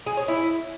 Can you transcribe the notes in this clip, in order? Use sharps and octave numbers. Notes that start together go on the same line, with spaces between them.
G#4
C#5
E4